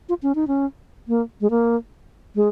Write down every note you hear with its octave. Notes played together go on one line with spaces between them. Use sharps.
F4
C#4
D#4
C#4
A#3
G#3
A#3
G#3